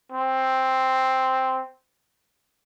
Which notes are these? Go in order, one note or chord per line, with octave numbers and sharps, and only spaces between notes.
C4